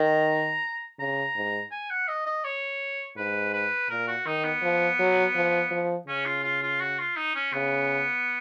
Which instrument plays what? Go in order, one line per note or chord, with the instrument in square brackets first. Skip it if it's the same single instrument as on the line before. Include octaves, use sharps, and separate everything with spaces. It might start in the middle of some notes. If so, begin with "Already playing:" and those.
Already playing: [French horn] D#3 [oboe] A#5
[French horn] C#3 [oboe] A#5
[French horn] G#2
[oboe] G#5
F#5
D#5
D#5
C#5
[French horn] G#2 [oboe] B4
[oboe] B4
[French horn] A#2 [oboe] A#4
[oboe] F#4
[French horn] D#3 [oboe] D#4
[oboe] B3
[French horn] F3
F#3
F3
F3
[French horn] C#3 [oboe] C#4
[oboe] F4
F4
F4
F#4
F4
D#4
C#4
[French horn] C#3 [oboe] B3